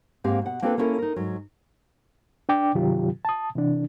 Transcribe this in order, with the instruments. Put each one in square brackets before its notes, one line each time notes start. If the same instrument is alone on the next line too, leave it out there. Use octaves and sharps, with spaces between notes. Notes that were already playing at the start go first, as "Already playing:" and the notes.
[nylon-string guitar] G#2 A#3 C4 G4 F5
B2 F#5
A#3 C4 D4 F4 A4 B4
A#3 B3 C#4 E4 A4 A#4
D#4 A#4
G#2 F#3
[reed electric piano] D4 D5 G5 D6
G2 C3 D#3 F#3 F4 G4
A5 D#6
C3 E3 D4